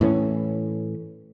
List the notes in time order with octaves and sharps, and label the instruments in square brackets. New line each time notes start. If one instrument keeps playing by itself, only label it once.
[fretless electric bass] A2 E3 C#4